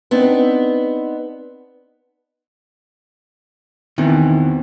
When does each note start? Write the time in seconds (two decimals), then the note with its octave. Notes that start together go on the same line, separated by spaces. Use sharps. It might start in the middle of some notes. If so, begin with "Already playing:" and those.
0.11 B3 C4 D4 D#4
3.98 E2 B2 D#3 E3 C4